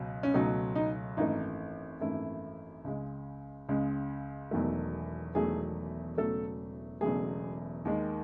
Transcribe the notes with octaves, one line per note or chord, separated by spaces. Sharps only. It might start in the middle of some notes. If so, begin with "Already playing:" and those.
Already playing: C#2 B2 F#3
C#4
C#2 B2 F#3 A3 D#4
D#4
G#1 F#2 E3 A3 D#4
G#1 F#2 E3 A3 E4
C#2 C#3 G#3
C#2 C#3 G#3
E1 E2 D#3 F#3 A3
E1 E2 D#3 F#3 A3 G#4
E1 E2 C#3 F#3 A3 A4
E1 E2 C#3 F#3 A3 G#4
D#2 D#3 G#3